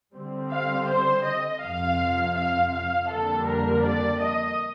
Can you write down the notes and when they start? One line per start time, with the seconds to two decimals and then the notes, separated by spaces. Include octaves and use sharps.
0.15 D3 G3 C4
0.52 F5
0.89 C5
1.26 D#5
1.62 F2 C3 F3 F5
2.37 F5
2.74 F5
3.10 F2 D3 G3 A#3 D4 A4
3.47 A#4
3.84 D5
4.21 D#5